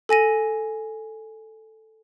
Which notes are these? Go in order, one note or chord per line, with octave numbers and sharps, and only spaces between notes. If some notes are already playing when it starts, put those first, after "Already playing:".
A4 G#5 A#6 D#7